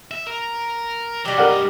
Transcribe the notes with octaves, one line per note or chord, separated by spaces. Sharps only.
E5
A#4
F#3 G3 G4
G2 A#4 D5 D#5 F#5